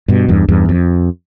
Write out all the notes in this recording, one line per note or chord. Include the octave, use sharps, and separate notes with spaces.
G2 B2
E2 G2
E2 G2
F2